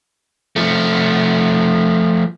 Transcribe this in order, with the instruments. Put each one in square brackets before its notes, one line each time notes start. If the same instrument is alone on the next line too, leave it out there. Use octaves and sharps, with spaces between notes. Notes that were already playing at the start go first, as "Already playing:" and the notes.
[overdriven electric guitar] F3 A3